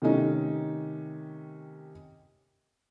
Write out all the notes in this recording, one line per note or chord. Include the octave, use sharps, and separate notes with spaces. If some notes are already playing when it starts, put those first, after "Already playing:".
C3 D#3 A3 C#4 D#4